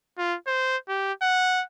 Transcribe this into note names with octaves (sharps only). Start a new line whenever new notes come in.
F4
C5
G4
F#5